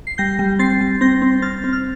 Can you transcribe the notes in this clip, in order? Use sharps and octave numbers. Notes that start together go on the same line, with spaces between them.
C7
G3 G6 A#6
G3
C4 A6 C7
G3
C4 G6 A#6
C4
C4 F6 A6
C4
F6